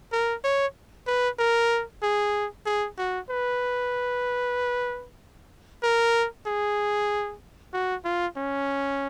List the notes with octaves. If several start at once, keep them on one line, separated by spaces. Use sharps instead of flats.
A#4
C#5
B4
A#4
G#4
G#4
F#4
B4
A#4
G#4
F#4
F4
C#4